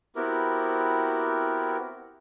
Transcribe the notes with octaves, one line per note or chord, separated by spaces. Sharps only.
B3 C4 E4 F#4 G4 A#4